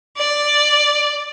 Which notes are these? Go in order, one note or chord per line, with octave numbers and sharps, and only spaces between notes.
D5